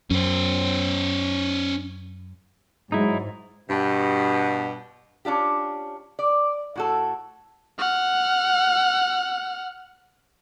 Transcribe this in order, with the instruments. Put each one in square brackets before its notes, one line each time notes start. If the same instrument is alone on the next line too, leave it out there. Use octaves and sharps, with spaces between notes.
[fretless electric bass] F#2 [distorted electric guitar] C#4 C5
[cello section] G#2 [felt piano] F#3 G#4 [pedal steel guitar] D#4 E4
[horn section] G2 B2
[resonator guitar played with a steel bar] C#4 D4 F4 G4
D5
A2 F#4 A4
[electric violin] F#5 F6